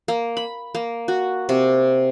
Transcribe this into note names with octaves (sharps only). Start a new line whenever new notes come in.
A#3
B5
A#3
F#4
C3